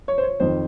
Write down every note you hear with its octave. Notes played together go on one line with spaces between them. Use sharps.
C#5
C5
C#5
F2 D#3 C5